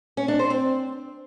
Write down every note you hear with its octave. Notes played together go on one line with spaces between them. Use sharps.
C#4
D4
C5
C4